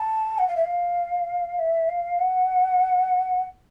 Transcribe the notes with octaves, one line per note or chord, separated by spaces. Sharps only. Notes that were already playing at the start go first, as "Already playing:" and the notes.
Already playing: A5
F#5
F5
E5
F5
E5
F5
F#5